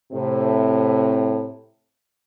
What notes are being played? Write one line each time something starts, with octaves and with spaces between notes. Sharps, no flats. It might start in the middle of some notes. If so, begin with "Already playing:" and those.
A2 C3